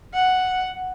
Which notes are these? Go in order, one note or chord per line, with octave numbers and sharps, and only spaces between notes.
F#5